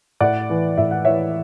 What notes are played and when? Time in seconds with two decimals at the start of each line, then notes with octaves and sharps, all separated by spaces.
0.21 A2 D5 F#5
0.50 E3
0.78 A2 E5
0.91 F#5
1.05 E3 C#5 E5